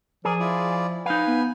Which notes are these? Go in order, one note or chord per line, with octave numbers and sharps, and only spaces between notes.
F3 G#4 A#4 D5
E4 F4 D5
D#4 B4 F5 G#5
B3